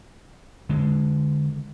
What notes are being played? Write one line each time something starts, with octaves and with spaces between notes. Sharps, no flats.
D3 G#3